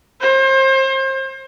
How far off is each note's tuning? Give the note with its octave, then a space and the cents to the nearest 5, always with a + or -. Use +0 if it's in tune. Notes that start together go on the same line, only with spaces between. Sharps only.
C5 +30